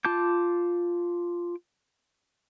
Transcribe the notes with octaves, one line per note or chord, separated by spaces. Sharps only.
F4 A5 D6 G6